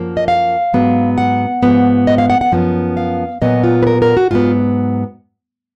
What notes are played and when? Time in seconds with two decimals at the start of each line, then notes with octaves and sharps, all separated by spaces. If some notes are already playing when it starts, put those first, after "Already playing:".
Already playing: F#2 F3 A#3
0.17 D#5
0.28 F5
0.73 G#2 F#3 B3
1.18 F#5
1.63 G#2 F3 B3
2.07 D#5
2.18 F5
2.30 F#5
2.41 F#5
2.52 F#2 F3 B3
2.97 F5
3.42 A#2 F#3 B3 D#5
3.64 F4
3.83 B4
3.87 A#4
4.02 A#4
4.17 F#4
4.31 G#2 F#3 B3 F4